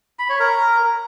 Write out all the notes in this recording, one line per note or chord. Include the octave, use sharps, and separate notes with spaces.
B5
C#5
A#4